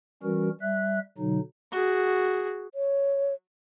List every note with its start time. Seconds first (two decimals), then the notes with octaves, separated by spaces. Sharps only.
0.23 E3 G3 C#4 F#4 A#4
0.61 G3 E5 F#6
1.18 B2 D3 F#3 D#4
1.72 F#4 G#4
2.73 C#5